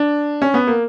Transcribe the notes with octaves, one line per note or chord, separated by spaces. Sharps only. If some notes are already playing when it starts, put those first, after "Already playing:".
Already playing: D4
C#4
B3
A#3